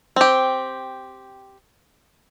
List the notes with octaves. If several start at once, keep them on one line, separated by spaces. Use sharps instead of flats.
C4 G4